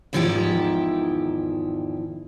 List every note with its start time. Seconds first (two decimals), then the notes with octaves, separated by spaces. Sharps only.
0.13 E2 G#2 D#3 F3 E4 G4